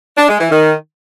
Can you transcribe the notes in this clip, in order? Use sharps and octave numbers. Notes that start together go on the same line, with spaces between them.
D4
G#3
E3
D#3